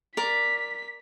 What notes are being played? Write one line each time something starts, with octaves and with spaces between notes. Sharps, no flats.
A#4 D5 B6